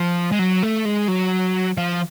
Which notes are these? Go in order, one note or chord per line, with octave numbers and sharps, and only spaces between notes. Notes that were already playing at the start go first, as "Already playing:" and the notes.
Already playing: F3
G#3
F#3
A3
G#3
F#3
F3